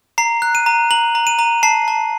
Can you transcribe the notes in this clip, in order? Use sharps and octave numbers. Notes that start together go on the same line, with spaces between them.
A#5 C7
F#6
D#7
A#5
A#5 F#7
A#5
D#7
A#5
A5 C7
A5